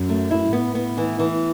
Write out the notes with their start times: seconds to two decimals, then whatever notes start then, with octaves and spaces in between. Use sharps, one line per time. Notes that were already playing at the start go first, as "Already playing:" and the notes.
Already playing: F#2
0.09 A3
0.31 E4
0.53 A2 B3
0.75 B3
0.98 E3
1.19 E3